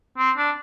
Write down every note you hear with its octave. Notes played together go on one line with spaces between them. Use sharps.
C4
D4